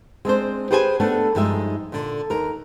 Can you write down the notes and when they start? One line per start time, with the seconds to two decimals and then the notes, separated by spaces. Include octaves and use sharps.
0.25 G#3 C4 D4 C5
0.71 G4 G#4 B4 C5 G5 G#5
1.00 A3 B3 D4 A4
1.35 G2 F3 G#3 D#4 E5
1.92 A#2 D3
2.30 D#2 A#4